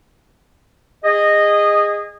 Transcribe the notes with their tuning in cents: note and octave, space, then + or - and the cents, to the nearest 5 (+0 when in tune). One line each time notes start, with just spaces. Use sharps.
G#4 -25 D#5 -10